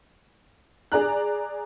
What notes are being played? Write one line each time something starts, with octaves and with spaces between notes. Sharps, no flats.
G#4 D5 A#5 F#6